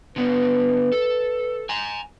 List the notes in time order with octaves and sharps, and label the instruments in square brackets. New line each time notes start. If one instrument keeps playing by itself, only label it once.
[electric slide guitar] D3 B3 [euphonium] B4
[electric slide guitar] A4
G#5 A#5